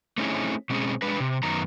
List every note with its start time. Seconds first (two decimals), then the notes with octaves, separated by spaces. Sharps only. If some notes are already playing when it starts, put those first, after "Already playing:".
0.18 A3 C4 C#4 D#4 E4 G#4
0.70 B2 G#3 C4 C#4 G#4
1.02 G#3 D4 B4
1.20 C3
1.43 F#2 D#3 B3 A#5